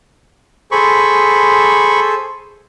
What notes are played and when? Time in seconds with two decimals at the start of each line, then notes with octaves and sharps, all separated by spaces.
0.72 G#4 A4 C5 B5 C#6